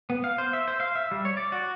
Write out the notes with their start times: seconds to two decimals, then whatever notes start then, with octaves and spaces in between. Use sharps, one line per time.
0.10 B3
0.24 F5
0.38 C5
0.53 E5
0.68 C5
0.80 F5
0.95 E5
1.11 G3
1.25 C#5
1.37 D5
1.52 F#4